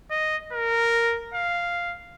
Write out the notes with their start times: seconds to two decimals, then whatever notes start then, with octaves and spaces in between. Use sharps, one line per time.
0.11 D#5
0.52 A#4
1.34 F5